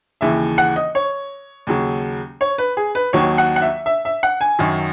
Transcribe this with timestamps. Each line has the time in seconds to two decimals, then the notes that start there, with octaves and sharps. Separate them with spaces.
0.21 D#2 C#3 E3 E5
0.58 F#5
0.76 D#5
0.95 C#5
1.67 D#2 C#3 F#3
2.41 C#5
2.58 B4
2.77 G#4
2.95 B4
3.13 D#2 D#3 F#3 C#5
3.38 F#5
3.56 F#5
3.62 E5
3.86 E5
4.05 E5
4.23 F#5
4.41 G#5
4.59 F#2 D#3 F#3